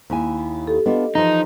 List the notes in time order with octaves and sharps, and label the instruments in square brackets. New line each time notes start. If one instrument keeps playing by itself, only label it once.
[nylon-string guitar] D#2 E4 G#5
[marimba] G4 A4
[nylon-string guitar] B3 D4 F4 [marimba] D#5
[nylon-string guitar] E3 F3 [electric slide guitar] D#4